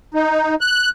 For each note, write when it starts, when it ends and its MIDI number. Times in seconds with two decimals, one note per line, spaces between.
0.14 0.55 63
0.61 0.90 90